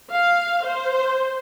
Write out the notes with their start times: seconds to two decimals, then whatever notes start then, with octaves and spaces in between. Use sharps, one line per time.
0.12 F5
0.65 C5